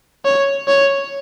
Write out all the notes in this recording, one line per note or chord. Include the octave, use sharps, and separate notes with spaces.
C#5
C#5